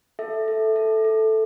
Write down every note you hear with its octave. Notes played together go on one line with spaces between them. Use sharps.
A4 E5
A4
A4
A4